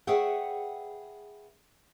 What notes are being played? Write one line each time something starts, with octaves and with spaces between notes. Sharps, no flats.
G#4 B4 C#5 E5 F#5 G5